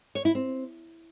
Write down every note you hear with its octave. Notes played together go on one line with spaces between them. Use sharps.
C#5
E4
C4